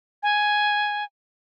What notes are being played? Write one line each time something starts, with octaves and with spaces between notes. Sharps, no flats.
G#5